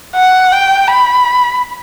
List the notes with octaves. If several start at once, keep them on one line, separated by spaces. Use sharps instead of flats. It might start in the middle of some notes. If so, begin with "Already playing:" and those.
F#5
G5
B5